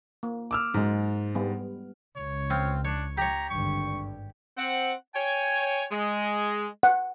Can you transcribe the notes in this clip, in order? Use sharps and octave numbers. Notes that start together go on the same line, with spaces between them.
A#3
D6 E6 F6
G#2 F#3 G#3
G3 B3
C#2 C#5
C4 F4
D4 C#5
G4 C#5 A#5
G#1 G2 D3 C#6
C4 F#5
C#5 G5 G#5
G#3
F#5